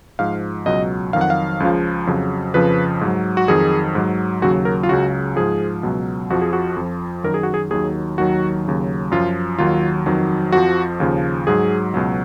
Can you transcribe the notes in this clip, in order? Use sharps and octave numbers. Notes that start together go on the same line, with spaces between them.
G#2 F3 F5
C#2 B2 F#3 D#5
F2 D#3 F#3 F5
F#5
F5
C#2 C#3 F3
F2 C#3 F#3
F2 C#3 F3 B4
G#2 F#3
F#4
F2 D#3 F#3 G#4
G#2 F#3
D#2 C#3 F#3 F#4
A#4
F4
C#2 C#3 F#3 F#4
G#2 F3 G#4
C#2 B2 F#3
F2 F3 F#4
G#4
F#4
F2 F3
F#2 D#3 F#3 A#4
G#4
F#4
G#4
D#2 D#3 F#3 G#4
D#2 D#3 F#3 F#4
D#2 C#3 F#3
F#2 F3 F4
D#2 D#3 F#3 F4
F2 D#3 F#3
F2 F3 F#4
D#2 C#3 F3
G#2 F#3 G#4
C#2 B2 F#3